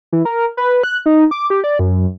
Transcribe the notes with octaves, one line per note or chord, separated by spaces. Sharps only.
E3
A#4
B4
F#6
D#4
D6
G4
D5
F#2